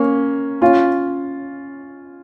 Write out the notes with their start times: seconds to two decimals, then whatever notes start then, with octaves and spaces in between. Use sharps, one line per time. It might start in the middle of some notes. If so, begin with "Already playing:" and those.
Already playing: A#3 C#4
0.61 C#4 F4